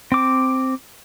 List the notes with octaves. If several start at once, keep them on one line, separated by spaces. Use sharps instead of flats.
C4 D6